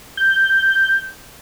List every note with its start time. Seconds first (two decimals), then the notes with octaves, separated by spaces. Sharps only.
0.17 G6